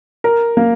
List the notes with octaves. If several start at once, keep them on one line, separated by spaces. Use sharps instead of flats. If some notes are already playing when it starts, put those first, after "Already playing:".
A#4
A#3